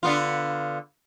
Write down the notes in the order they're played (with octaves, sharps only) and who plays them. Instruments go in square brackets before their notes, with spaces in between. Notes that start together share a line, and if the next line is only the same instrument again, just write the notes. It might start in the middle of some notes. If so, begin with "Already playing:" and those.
[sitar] D3 B3 F4